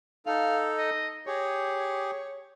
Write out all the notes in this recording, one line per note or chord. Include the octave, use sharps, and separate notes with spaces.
D#4 A4 F5
D#5
G4 G#4 C#5